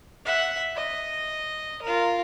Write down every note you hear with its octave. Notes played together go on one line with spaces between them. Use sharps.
E5 F#5
D#5
F4 A#4